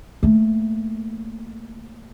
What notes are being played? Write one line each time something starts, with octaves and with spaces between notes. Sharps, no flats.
A3 A#3